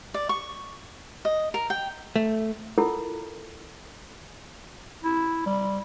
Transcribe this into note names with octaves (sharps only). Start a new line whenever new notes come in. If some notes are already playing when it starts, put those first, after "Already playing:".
D5
C#6
D#5
A#4
G5
A3
E4 F4 A4 A#4 F#5
E4
G3